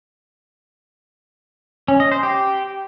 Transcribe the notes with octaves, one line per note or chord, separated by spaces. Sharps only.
C#4
D#5
C5
G4